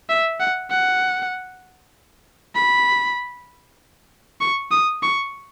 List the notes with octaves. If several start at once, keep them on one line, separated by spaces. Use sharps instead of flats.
E5
F#5
F#5
B5
C#6
D#6
C#6